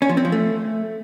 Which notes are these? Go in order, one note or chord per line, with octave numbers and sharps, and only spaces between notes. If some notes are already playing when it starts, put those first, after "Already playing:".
C#4
F3
C4
F3
A3